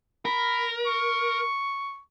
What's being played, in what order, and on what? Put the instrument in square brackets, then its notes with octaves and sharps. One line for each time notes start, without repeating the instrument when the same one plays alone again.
[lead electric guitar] A#4 [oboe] B5
[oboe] C#6